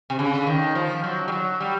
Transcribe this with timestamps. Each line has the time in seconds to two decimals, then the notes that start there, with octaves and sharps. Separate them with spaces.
0.10 C3
0.19 C#3
0.35 D3
0.47 D#3
0.75 F3
1.04 F#3
1.28 G3
1.32 F#3
1.61 G3